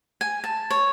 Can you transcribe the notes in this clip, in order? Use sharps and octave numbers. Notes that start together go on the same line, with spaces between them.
G#5
A5
C#5